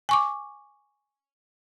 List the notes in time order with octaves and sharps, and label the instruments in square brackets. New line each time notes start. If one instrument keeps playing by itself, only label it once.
[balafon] G#5 C#6 D6